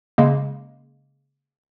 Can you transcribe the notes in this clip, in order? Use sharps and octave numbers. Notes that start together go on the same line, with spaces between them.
C#3 G#3 A#3